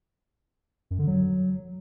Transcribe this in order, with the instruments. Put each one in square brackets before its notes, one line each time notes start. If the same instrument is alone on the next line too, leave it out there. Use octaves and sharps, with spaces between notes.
[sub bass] F#2
D3
F#3